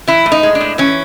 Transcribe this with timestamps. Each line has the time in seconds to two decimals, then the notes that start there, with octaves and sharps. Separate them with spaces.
0.07 E3 E4
0.26 A2
0.32 D#4
0.43 G#3
0.55 D4
0.61 A2
0.78 E3 C#4